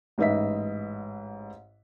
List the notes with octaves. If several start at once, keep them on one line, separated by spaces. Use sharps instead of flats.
A1 G#2 B4 D#5 E5 B6